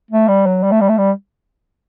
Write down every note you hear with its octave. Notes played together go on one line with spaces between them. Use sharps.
A3
G3
F#3
G3
A3
G3
A3
G3